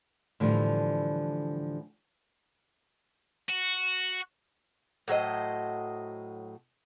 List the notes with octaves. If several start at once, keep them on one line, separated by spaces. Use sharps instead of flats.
A2 D3 E3 F3 G3
F#4
A2 F#3 C5 D#5